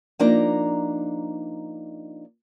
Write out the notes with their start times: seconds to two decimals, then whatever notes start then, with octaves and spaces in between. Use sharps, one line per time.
0.19 F3 A#3 D4 D#4 A#5